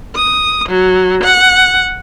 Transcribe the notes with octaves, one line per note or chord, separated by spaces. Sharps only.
D#6
F#3
F#5